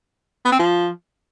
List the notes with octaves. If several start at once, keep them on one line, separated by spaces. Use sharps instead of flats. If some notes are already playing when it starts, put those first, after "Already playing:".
B3
C4
F3